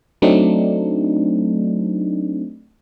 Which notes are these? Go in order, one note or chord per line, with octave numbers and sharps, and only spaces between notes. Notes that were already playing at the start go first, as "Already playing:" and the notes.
F#3 A3 C4 D4 D#4